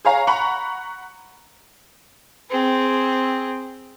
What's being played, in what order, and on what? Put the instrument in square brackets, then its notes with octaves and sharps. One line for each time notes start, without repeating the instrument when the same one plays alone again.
[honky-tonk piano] G#4 C#5 F5 A#5
F#5 A#5 B5 C#6
[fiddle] C4 G#4